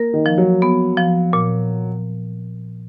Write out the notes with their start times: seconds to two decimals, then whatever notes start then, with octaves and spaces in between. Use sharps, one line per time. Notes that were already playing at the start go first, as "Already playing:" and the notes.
Already playing: A#3 A#4
0.14 D#3
0.26 F3
0.38 F#3
0.62 B3
0.98 F3
1.33 A#2